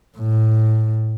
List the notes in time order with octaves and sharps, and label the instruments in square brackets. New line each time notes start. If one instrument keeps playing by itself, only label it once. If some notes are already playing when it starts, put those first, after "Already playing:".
[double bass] A2